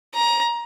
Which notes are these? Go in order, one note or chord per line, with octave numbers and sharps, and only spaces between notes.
A#5